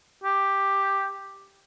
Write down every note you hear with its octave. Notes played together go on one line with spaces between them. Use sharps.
G4